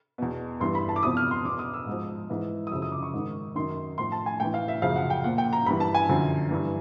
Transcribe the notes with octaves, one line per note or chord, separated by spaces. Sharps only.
E2 B2
G2 E3 C6
B5
A5
D6
E2 C3 F3 D#6
F6
C6
E2 B2 D6
D#6
E6
G#2 F3
G#2 E3
D#6
F#2 C#3 F3 E6
D#6
D6
C#6
G#2 D#3
F#2 D#3 C6
A2 F3 C6
A5
G#5
A2 E3 G5
F5
E5
F#2 C#3 F3 F5
F#5
G5
A#2 F3 F#5
G5
A#5
G2 E3 B5
A5
G#5
F#2 D3 F3
G2 E3